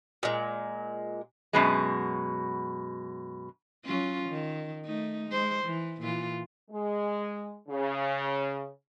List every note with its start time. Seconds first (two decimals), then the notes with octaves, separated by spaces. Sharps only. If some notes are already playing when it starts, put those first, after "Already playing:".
0.23 A#2 G#3
1.53 F#2 B2 G#3
3.85 F#3 C#4 F4
4.29 D#3
4.85 A3 D#4
5.29 G#3 C5
5.64 E3
6.01 A#2 E3 F4
6.70 G#3
7.68 C#3